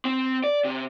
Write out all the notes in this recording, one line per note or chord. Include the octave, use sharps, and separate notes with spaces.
C4
D5
C3